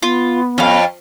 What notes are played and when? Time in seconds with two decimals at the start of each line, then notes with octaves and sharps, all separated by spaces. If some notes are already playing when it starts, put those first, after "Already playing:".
0.03 B3 F4
0.58 F2 C#4 F5